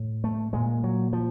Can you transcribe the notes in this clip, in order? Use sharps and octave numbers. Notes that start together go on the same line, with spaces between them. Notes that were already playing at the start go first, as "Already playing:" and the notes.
Already playing: A2
A3
A#2 G#3
F#3
F3